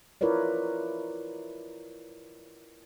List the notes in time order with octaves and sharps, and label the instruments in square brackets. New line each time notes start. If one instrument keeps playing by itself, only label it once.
[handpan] E4 F4 A#4 B4 C#5 D5